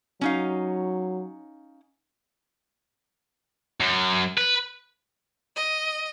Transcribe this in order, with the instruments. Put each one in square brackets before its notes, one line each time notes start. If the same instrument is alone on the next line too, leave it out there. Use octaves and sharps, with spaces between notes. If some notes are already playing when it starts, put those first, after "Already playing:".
[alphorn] F#3 [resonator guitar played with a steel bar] C#4 D#4 F5
[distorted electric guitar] F#2
B4
[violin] D#5